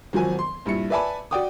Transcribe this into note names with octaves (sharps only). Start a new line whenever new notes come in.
G#1 F3 F#3 G#5
C6
A#1 G2 E4 C#7
B4 D5 E5 G#5 A5 B5
F#4 D5 F#5 G5 D6 D#6